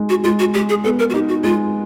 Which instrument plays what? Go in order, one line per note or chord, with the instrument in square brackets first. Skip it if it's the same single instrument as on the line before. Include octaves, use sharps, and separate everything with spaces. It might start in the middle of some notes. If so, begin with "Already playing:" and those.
Already playing: [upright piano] G#3 D#4
[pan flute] F#4
[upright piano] G#3 [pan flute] F4
[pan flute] F#4
[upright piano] G#3 [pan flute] G4
[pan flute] G#4
[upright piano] B3 [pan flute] A4
[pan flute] A#4
F#4
[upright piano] D#4 [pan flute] G4
[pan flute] F#4
[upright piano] G#3 [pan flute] F4